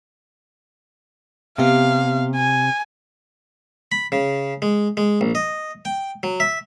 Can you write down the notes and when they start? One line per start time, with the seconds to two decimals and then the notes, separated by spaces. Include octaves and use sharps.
1.58 C3 B3 G4 E5 F5
2.36 G#5
3.92 B5
4.12 C#3
4.62 G#3
4.97 G#3
5.21 A#1
5.35 D#5
5.85 G5
6.23 F#3
6.40 E5